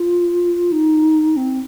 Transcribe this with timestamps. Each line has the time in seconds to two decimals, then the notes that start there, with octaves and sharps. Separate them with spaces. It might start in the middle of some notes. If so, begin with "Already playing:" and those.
Already playing: F4
0.72 D#4
1.37 C4